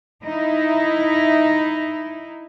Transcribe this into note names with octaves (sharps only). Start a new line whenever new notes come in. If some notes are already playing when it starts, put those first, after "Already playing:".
D#4 E4